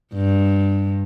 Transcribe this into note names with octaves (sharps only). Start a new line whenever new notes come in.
G2